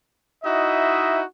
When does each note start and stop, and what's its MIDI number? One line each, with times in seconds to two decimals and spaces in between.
0.44 1.23 63
0.44 1.23 64
0.44 1.23 66
0.44 1.23 75
0.44 1.23 76